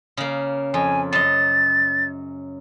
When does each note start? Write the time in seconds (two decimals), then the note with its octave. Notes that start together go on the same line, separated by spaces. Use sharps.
0.17 C#3 A#3
0.74 F2 G#5
1.13 F#2 D#5 A6